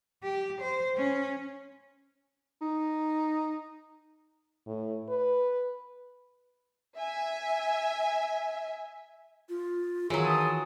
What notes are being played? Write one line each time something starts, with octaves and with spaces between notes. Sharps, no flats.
G4
C5
C#4
D#4
A2
B4
E5 G#5
F4
D#3 E3 F#3 F4 G#4 C#5
A5 D#6